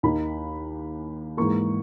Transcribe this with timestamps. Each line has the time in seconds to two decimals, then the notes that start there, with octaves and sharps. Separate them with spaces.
0.03 D#2 D#3 A#3 D#4 B5
1.37 G#2 E3 A#3 C#6